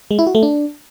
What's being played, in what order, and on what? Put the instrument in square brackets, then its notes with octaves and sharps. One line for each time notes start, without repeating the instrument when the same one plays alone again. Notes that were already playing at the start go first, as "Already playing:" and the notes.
[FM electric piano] G#3
E4
F#4
A3
D4